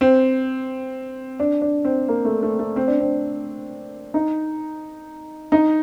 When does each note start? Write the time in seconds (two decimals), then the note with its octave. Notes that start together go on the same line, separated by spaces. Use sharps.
0.01 C4
1.39 D4
1.62 D4
1.85 C4
2.08 A#3
2.25 A3
2.43 A3
2.59 A3
2.76 C4
2.87 D4
3.00 C4
4.14 D#4
5.52 D#4